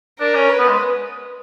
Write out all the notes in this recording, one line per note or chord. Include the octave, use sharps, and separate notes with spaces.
D4 A#4
C#4
B4
B3
G#3